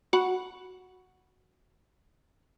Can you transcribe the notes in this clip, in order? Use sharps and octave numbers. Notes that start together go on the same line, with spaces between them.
F#4 F#5 B5